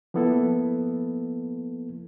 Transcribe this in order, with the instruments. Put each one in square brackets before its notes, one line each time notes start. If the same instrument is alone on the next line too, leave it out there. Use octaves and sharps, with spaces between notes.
[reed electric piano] F3 A#3 B3 E4 A4